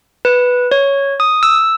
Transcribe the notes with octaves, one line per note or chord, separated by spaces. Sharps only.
B4
C#5
D#6
E6